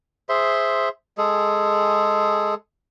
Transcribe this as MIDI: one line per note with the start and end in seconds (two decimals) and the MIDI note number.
0.29 0.89 68
0.29 0.89 72
0.29 0.89 76
0.29 0.89 84
1.18 2.55 56
1.18 2.55 68
1.18 2.55 69